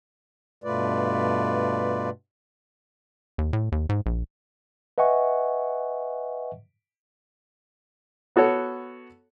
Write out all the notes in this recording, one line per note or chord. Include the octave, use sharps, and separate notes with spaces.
G2 B2 A3 F4 B4 D5
D#2
A2
D#2
G#2
A#1
B4 D#5 E5 F#5 G#5 C#6
B3 F#4 A4 C#5